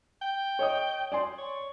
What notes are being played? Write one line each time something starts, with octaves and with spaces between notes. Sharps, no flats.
G5
C#5 D#5 D#6
D5 G#5 C6
C#5